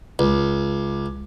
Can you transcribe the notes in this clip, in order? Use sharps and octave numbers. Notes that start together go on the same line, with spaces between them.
C#2